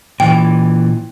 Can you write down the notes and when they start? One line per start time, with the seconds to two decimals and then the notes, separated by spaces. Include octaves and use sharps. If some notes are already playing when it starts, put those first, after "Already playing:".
0.20 A#2 E3 G5